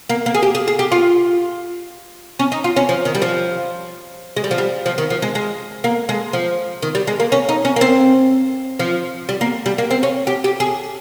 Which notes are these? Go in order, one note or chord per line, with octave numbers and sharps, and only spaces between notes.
A#3
A#3
G#4
G4
G#4
G#4
G4
F4
C#4
D#4
F4
C#4
F3
D#3
G3
F3
G#3
G3
F3
G3
F3
D#3
F3
G#3
G#3
A#3
G#3
F3
D#3
G3
G#3
A#3
C#4
D#4
C#4
A#3
C4
F3
G3
A#3
G3
A#3
C4
C#4
G4
G4
G#4